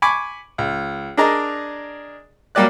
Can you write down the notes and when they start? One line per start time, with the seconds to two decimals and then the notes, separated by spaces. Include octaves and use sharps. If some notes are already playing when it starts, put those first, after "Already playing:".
0.02 G#5 B5 C#6 D6
0.58 C#2
1.17 D4 G#4 A#4 D5 D#5 A#5
2.55 F#3 G3 A#3 G4 D5 F#6